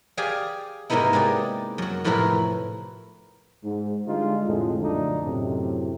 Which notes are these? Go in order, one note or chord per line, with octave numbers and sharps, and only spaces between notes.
G4 G#4 D5 F5 G#5
G#2 C3 A#3 B3 D#4 E4
G#3 G4 G#4 D5
F#2 F#4
F2 A2 C3 E4 A#4 B4
G#2
D3 G3 G#3 D4 D#4 F4
C2 F2 A2 D3 F3 G#3
A#1 F#2 D3 A3 D4 D#4
F#2 A2 C3